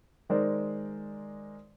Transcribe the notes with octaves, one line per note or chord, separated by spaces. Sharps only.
D#3 G#3 A#4 C5 D5